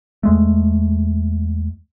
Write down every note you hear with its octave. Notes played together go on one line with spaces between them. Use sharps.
E2 G#3 A3